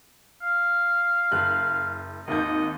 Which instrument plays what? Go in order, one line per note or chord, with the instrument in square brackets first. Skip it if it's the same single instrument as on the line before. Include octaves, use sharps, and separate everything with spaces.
[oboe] F5
[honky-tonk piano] F#1 F#6
[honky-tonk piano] G#1 D#2 G6 [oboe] D#5